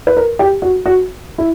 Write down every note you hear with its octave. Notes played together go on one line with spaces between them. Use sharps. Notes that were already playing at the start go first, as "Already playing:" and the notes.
B4
A#4
G4
F#4
F#4
E4